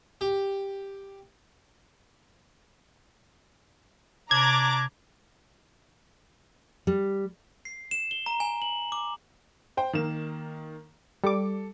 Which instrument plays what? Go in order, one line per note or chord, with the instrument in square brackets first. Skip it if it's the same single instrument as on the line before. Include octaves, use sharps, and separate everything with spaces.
[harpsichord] G4
[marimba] C3 [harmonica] D4 [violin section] A#5 D6 [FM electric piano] G#6
[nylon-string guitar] G3
[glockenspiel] C7
E7
G7
A#5
G#5
F#7
D6
[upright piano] C5 G5
D#3 A#3 E7
[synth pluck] G3 D6 [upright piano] A4